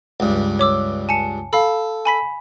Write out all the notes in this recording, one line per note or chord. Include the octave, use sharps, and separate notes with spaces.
C#2 G2
C#5 D6 E6
G#5 A5 C#7
A4 F5 B5
G#5 B5 B6